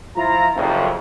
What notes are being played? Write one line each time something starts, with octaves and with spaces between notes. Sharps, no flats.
F3 E4 F4 A#5
F#1 C2 F2